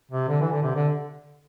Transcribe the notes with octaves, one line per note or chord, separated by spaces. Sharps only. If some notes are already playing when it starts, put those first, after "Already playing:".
C3
D3
E3
D3
C3
D3